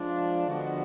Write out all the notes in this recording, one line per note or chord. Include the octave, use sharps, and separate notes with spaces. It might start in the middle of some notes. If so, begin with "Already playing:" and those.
Already playing: F3 G#3 D4 F4
D3 F3 G#3 B3 F#4